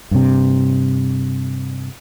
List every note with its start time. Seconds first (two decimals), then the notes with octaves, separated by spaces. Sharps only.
0.11 G2 C3